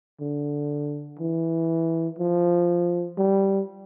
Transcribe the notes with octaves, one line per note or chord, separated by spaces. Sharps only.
D3
E3
F3
G3